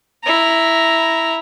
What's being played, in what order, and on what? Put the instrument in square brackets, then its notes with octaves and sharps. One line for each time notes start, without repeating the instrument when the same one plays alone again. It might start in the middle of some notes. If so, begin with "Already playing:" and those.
[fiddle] E4 A#5